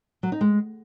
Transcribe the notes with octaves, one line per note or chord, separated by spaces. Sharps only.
F#3
D#4
G#3